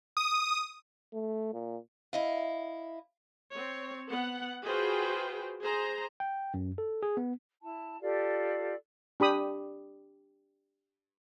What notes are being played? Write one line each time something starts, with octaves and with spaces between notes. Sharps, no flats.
D#6
A3
A#2
E4 D#5 F5
C4 C#5
B3 F#5
F4 F#4 G#4 B4 C5 G5
G#4 C5 A#5
G5
F#2
A4
G#4
B3
E4 A5
F4 G4 A4 D5
D4 G4 B5 D#6